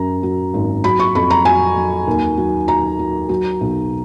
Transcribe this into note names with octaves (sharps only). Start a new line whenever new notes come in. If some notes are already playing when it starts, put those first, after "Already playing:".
Already playing: F#2 F#3 A#5
F#3
G#1
F#3 B5
C#6
F2 B5
A#5
F#3 G#5
F#3
D#2
F#3
F#3 A#5
F#3
F#3
B1